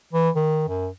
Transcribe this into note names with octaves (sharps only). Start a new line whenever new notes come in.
E3
D#3
F#2